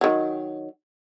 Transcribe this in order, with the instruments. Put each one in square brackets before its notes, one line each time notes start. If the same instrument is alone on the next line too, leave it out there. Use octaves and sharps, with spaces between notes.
[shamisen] D#3 F#3